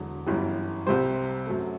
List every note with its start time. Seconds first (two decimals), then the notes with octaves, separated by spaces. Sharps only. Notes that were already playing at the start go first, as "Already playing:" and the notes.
Already playing: E1 E2 D3 F#3
0.26 G1 F#2 E3 G3
0.86 C2 C3 G3 C5
1.46 F#2 F#3 A3